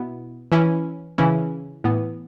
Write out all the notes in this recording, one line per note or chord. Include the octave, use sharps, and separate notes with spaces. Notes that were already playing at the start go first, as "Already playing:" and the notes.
Already playing: B2 B3 E4
E3 C#4 E4
C#3 E3 C#4 E4
A2 E3 B3